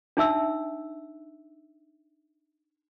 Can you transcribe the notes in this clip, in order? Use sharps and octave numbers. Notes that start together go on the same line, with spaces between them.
D4 D#4 E5 E6